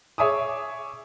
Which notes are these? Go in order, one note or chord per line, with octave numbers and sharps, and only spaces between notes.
G#4 C#5 E5 G#5 D6 D#6